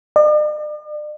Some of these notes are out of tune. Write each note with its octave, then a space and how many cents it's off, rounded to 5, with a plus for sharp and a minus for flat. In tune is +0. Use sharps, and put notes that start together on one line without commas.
D5 +45